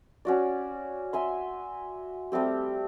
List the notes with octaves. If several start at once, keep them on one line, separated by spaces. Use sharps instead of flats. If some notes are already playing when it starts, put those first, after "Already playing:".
C#4 F#4 D5
E5 G#5 C6
G3 A3 C4 G4